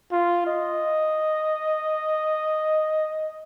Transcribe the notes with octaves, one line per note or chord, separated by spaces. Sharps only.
F4
D#5